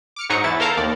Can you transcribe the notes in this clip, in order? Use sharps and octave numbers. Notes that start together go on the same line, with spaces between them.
D6 F6 C#7
G#2 F#3 D#4 A#5 C#6 C#7
E2 E4 A6
A4 A#4 F5 A5 A#5 G6
D#2 D5